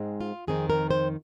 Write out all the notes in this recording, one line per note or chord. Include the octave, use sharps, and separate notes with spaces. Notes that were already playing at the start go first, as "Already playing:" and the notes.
Already playing: G#2 G#3 C4
F4
F2 D#3 C4 D#4 G#4
A#4
C5